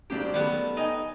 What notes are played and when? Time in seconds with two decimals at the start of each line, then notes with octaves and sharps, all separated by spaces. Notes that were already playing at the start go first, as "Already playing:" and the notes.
0.10 A2 C#3 F#3 A#3 D4 G4 C5 D5
0.34 D#3 G3 B3 A4
0.77 D#4 D#5 G5 G#5